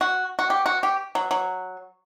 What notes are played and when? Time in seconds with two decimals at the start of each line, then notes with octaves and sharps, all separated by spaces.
0.01 F#4
0.39 F#4
0.50 G4
0.66 F#4
0.83 G4
1.15 F#3
1.31 F#3